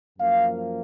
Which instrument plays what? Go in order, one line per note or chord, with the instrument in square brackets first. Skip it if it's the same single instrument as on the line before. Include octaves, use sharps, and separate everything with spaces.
[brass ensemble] F#2 F3 A#3 F5